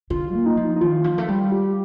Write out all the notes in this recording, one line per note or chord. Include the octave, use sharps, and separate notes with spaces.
D3 F4
A#3
D#4
F3
D#4
D#3 F4
F3
A3
G3
G4